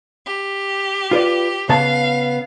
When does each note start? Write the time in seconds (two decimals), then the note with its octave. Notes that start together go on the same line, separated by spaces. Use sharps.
0.25 G4
1.11 F4 B4 D5
1.69 C#3 B3 F5 A5